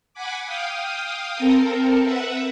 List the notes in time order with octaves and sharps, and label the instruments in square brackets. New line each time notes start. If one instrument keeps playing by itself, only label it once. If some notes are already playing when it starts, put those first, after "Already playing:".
[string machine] F#5 G#5 B5 D6
F5 G5 D#6
C4 A4 A#4
B4 E5 F#5